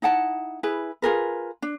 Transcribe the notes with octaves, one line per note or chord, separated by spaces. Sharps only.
D#4 E4 F#5 A5
E4 G#4 B4
F4 G#4 A#4 B4
D4